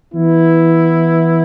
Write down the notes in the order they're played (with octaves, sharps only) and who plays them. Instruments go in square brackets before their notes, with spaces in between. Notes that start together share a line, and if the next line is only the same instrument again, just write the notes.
[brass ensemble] E3 B3 E4